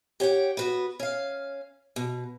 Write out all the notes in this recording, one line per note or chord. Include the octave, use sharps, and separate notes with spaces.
G4 C#5 F#5 G5
B3 F#4 B4
C#4 F5
B2